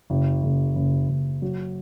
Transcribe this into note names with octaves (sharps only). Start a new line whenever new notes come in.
F#1
F#1
F#1
F#1
F#3